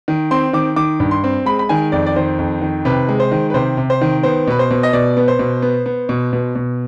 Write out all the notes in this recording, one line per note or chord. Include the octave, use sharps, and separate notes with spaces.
D#3
C4 C6
D#3 D6
D#3 D6
G2
C6
C4
G#3 B5
B5
D#3 G#5
F2 D5
D5
D#3 C5
F2
D#3
C3 B4
G#3
C5
D#3
B4
C3 C5
C3
C5
D#3
B3 C5
B2 B4
C5
B2
D#5
B2 D5
B3
C5
B2
B3
B3
B2
B2
B2